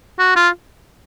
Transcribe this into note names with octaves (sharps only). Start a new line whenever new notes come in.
F#4
F4